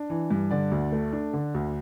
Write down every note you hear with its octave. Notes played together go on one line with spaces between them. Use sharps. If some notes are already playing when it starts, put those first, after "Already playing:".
Already playing: D4
E3
G2
D3 D5
D2
A3
D4
D3
D2